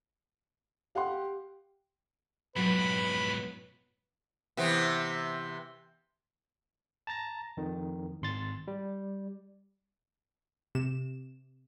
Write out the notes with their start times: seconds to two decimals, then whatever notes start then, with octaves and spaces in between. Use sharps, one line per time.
0.95 G4 F5 F#5 C6
2.56 F2 G#2 B2 F#3 B4 B5
4.57 C3 E3 B3
7.07 A5 A#5 A6 A#6
7.57 F2 D#3
8.22 G#1 C6 A6
8.68 G3
10.75 C3 E7